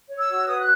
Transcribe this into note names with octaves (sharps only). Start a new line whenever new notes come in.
C#5
E6
F#4
B4 D#6
F#6